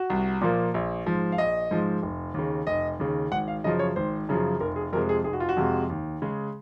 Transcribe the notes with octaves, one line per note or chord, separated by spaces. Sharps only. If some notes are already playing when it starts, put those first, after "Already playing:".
Already playing: F#4
C2
A#2 F3 A#3
A#1
G#2 F3
F5
A#1 D#5
G#2 F3
F1
D#2 C#3
F1 D#5
D#2 C#3
G#1 F#5
F5
F#2 C#3 F3 D#5
C#5
G#1 C5
F#2 C#3 F3
F1 A#4
G#4
F2 C3 F3 G#3 A#4
G#4
F1 G#4
F#4
F4
F#4
F2 C3 F3 G#3
D#2
C#3 G#3